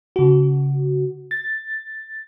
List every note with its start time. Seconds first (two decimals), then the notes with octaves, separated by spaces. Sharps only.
0.16 C#3 F#4
1.31 A6